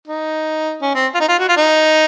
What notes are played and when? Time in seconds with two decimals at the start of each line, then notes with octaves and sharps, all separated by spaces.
0.08 D#4
0.82 C#4
0.95 C4
1.15 F4
1.20 D#4
1.29 F4
1.39 F#4
1.48 F4
1.57 D#4